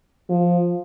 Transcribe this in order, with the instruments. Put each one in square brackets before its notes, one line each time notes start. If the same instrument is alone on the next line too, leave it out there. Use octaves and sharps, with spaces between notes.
[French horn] F3